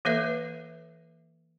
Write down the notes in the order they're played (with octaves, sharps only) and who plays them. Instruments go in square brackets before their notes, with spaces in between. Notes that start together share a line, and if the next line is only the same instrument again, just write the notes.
[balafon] E3 A#3 A4 B4 E5